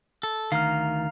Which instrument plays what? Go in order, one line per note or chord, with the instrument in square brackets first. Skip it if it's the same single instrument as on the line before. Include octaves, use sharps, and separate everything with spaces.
[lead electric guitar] A4
[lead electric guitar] D2 D#3 [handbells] F5 A#5 F6